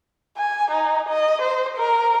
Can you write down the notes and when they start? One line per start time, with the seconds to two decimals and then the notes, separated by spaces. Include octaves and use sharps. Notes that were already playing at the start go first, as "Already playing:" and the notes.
0.37 G#5
0.71 D#4
1.09 D#5
1.42 C5
1.77 A#4